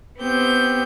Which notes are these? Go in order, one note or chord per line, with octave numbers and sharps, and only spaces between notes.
B3 C4 G4 G6